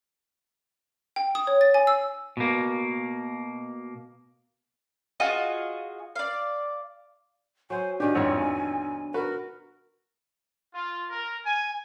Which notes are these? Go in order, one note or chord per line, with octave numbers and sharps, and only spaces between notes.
G5
D#6
C#5
A6
G#5
E6
B2 A#3
F4 F#4 G#4 D#5
D5 F5
F#3 C5 G#5
B2 D#3 D4 G4 G#5
G#1 F2 A2 F#3 C#5
F#4 A#4 B4
F4
A#4
G#5